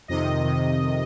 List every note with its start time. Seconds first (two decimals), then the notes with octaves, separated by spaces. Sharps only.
0.08 F2 C3 D#3 D#5
0.44 F2 C3 D#3